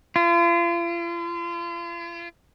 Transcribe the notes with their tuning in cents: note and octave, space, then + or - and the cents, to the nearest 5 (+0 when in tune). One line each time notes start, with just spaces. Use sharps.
F4 -40